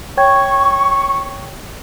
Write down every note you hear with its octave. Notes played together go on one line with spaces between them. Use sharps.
C#5 G5 C#6 G#6